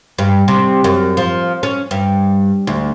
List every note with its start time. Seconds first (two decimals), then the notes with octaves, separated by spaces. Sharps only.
0.18 G2
0.48 C3
0.84 F#2
1.17 F3
1.63 C#4
1.91 G2
2.67 D2